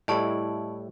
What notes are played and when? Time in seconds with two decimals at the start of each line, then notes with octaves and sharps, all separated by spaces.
0.08 A2 G3 E4 D#5 A5 C#6